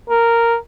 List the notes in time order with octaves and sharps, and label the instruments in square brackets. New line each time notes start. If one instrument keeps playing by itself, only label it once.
[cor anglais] A#4